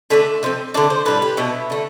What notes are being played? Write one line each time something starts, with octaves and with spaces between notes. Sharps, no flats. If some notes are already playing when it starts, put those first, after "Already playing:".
D3 A3 D4 E5
D3 F3 C4
D3 A3 D4 D5
C5
A2 G3 D4 B4
G4
B2 B3 D4 E4
D3 A3